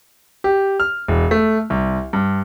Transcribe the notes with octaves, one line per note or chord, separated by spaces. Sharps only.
G4
F6
E1
A3
C2
G2